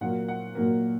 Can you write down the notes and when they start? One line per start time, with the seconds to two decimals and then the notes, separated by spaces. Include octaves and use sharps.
0.01 A#2 F#3 A#3 F#5
0.28 F#5
0.55 A#2 F#3 A#3